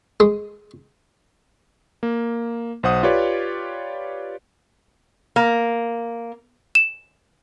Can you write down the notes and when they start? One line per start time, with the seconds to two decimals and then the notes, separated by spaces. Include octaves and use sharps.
0.20 G#3
2.03 A#3
2.83 B1 C5 F#5 D#6
3.03 F4 G4 B4 C#5 D5
5.36 A#3
6.75 E7